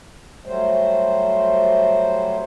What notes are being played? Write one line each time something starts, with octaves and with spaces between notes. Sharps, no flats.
F#3 G3 A3 C5